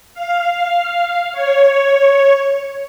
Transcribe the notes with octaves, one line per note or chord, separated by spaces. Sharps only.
F5
C#5